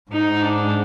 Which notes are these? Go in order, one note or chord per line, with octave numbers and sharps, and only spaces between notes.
G#2 D#4
D4